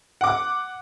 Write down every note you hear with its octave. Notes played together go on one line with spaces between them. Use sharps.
F#5 D6